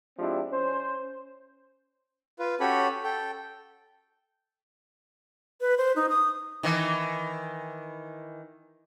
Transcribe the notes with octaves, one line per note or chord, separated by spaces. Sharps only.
F3 G#3 C4 D4 E4 G4
C#4 C5
F4 B4
C#4 F#4 G4 A4 C#5 B5
A4 G5
B4
C5
D#4
D#6
D#3 E3